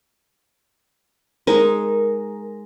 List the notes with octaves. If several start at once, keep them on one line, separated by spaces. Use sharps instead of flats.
G#3 D#4 A#4